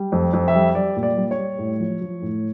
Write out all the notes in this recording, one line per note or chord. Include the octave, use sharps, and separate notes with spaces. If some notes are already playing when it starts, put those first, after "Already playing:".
Already playing: G3
F2
F2
E5
G3
G3 D5
A#2
D5
G3
C#5
G3
A2
F3
F3
A2